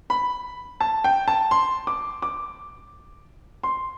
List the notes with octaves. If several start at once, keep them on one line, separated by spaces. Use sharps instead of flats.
B5
A5
G5
A5
C6
D6
D6
C6